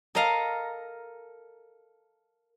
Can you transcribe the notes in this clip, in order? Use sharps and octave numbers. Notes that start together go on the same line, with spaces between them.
A4 A#4 D#5 F5 A#5